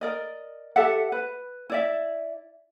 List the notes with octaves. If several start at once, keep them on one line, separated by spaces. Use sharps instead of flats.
A#4 D5 D#5
G4 A4 E5 F#5
B4
E4 D5 E5